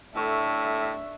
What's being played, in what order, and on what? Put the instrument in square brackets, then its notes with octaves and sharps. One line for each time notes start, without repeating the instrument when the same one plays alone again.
[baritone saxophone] A2 [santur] A3 C#6 [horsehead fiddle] D4 E5